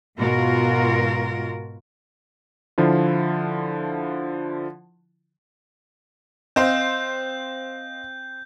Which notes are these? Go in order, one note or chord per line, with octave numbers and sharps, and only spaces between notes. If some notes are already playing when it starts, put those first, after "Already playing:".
G#2 B2 F4 F#4 A#4
D3 F3 E4 F4
C4 C5 D#5 F5 G6